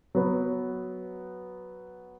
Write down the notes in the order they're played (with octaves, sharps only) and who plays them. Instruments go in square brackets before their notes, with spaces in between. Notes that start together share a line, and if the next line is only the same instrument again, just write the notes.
[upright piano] F#3 B3